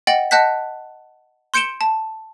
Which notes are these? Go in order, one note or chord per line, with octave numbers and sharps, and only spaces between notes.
D#5 F#5 G5 A6 F#7
D#5 F#5 A5 F#6 G6 B6
C6 G6 C#7 D7 E7 G7
A5